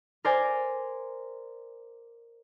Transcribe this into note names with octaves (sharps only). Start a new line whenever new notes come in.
A#4 C5 D5 G#5 A#5